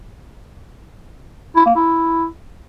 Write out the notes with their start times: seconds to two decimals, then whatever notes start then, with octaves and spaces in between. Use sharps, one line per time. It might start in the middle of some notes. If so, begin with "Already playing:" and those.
1.56 E4
1.66 A#3
1.76 E4